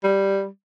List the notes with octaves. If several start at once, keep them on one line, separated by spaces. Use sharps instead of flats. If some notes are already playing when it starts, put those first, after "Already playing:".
G3